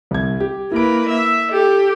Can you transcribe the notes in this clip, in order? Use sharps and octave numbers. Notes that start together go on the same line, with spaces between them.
C2 G#6
G4
A#3 E4 B4 D7
E5
G4 A4